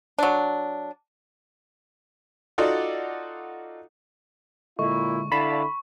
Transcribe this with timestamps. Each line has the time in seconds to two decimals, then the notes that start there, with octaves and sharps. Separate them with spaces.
0.19 F#3 D4
2.58 D#4 F4 F#4 A4 D5 F#5
4.79 A#2 D3 G#3 E4 C#6
5.32 D3 E4 D5 F5 A5 B5